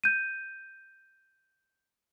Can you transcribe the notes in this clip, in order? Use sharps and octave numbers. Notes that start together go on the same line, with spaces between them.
G6 D#7